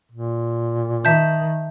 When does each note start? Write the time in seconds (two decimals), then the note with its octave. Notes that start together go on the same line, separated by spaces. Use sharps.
0.12 A#2
1.05 D#3 E5 A5 G6